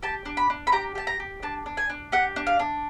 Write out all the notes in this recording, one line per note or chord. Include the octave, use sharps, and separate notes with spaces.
G4 A5
D4
B5
D4
B5
G4 A#5
G4 A5
A#5
G4
D4 A5
D4
G#5
D4
G4 F#5
D4
F5
D4